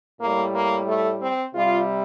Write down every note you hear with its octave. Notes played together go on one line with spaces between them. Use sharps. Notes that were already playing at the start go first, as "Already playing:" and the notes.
A2 G3 A#3
A#3
A3
C4
C3 G3 F4